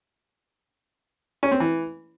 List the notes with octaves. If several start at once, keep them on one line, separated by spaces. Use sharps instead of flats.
C#4
C4
E3